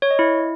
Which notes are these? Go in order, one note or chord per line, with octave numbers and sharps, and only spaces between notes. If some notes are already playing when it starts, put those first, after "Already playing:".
C#5
D#5
E4